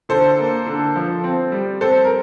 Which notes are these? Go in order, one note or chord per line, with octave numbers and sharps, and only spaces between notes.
D3 A4 C5
A#3
D3
F3
C4
G3
C4 A4 C5
A#4